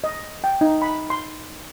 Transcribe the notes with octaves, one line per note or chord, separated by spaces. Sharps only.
D#5
G5
D#4
B5
C6